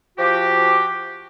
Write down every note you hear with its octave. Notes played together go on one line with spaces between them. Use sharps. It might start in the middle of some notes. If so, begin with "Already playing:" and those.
F3 F#4 G4